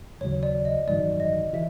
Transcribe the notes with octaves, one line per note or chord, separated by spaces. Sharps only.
D#2 C#3 F#3 C#5
D5
D#5
A1 G2 D#3 F#3 D5
D#5
E3 E5